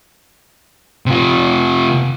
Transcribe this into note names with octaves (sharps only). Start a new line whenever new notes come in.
C3 F4